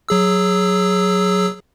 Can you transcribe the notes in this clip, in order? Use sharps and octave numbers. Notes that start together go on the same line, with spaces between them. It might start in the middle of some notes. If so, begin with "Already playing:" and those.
F#3 G#4 E6